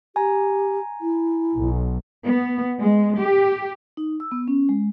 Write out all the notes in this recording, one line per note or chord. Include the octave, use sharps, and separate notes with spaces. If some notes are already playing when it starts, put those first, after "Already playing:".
G4 G#5 A#5
E4
B1
B3
G#3
G4
D#4
E6
B3
C#4
G#3